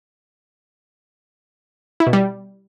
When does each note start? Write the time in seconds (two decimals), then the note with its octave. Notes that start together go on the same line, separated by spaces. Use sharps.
2.00 E4
2.07 B2
2.13 G3